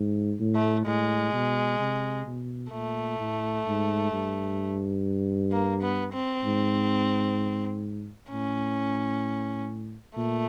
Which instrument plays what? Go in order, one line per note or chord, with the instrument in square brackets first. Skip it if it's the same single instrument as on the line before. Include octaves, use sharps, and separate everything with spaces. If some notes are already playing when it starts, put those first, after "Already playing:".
Already playing: [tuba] G#2
A2
[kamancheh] A3
[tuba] A2 [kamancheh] G#3
[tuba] B2
C3
B2
[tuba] A#2 [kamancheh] A3
[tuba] A2
G#2
G2
[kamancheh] A#3
B3
C4
[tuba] G#2
[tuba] A2 [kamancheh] C#4
[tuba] A#2 [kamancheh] A3